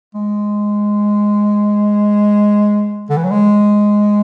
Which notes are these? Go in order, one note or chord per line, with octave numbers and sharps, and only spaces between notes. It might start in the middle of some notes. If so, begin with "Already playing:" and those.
G#3
D3
E3
F#3
G#3